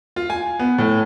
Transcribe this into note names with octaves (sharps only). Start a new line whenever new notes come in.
F4
G#5
B3
A2